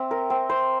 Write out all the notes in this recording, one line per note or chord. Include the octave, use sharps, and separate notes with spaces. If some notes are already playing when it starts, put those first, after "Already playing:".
Already playing: C4 E5
A#4
C4
C5